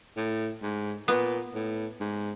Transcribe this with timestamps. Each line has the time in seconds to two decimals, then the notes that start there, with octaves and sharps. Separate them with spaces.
0.17 A2
0.62 G#2
1.08 A#2 B3
1.55 A2
2.00 G#2